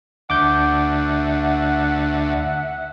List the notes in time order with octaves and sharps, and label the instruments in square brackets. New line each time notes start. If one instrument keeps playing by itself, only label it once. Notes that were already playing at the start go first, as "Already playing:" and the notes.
[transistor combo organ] D2 [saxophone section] E5 F#5 [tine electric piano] D6 G6